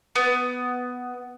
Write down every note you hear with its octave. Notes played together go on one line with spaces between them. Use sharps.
B3